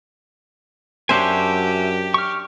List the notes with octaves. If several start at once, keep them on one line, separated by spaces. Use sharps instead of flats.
F#2 D4 F#4 G4 C5 E5 G#5
C#6 F6